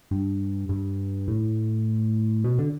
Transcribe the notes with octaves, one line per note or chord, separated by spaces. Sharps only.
G2
G2
A2
B2
D3